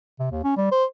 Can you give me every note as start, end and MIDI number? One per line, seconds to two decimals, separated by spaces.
0.19 0.27 48
0.31 0.41 39
0.44 0.54 61
0.57 0.71 55
0.71 0.84 72